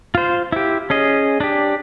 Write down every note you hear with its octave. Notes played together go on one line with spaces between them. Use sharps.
F4 C5
E4 G4
C#4 G#4 D#5
D4 G4